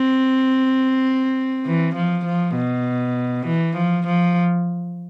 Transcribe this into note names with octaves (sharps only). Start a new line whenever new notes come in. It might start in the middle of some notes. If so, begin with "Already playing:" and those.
Already playing: C4
E3
F3
F3
B2
E3
F3
F3